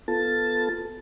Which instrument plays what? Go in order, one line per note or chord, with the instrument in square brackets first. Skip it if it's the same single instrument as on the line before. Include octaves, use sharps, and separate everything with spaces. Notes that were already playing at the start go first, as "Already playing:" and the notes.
[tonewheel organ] B3 F4 A4 A5 A6